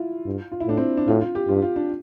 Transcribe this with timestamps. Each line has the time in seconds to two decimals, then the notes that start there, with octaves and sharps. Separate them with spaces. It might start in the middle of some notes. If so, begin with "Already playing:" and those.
Already playing: E4 F4
0.26 G2
0.52 F4
0.60 E4
0.67 A2 D4
0.77 C4
0.97 D4
1.08 A2 F4
1.21 F4
1.35 G4
1.48 G2 F4
1.62 F4
1.76 D4